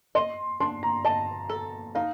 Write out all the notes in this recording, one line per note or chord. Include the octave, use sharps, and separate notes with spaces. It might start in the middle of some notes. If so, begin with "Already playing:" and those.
D#5 C6
D4 C6
A#5
D#5 A5
A4
D#4 F5